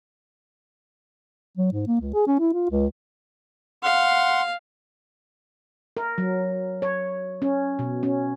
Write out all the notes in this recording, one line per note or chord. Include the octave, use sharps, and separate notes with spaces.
F#3
G#2
A#3
C#2
G#4
C#4
E4
F4
C#2
F5 F#5 C6
A#4
F#3
C#5
C#4
B2
C#4